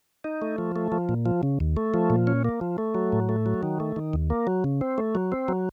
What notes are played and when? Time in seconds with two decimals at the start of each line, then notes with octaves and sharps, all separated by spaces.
0.24 D#4
0.42 A3
0.58 F3
0.76 A3
0.92 F3
1.09 A#2
1.26 F3
1.43 C#3
1.60 D#2
1.77 A3
1.94 F3
2.10 A#2
2.27 C#4
2.45 A#3
2.61 F3
2.78 A3
2.95 F#3
3.13 A2
3.29 A3
3.46 F#3
3.63 D#3
3.80 A3
3.96 D#3
4.13 D#2
4.30 A#3
4.47 F#3
4.64 C#3
4.81 C4
4.98 A3
5.15 F#3
5.32 C4
5.48 F#3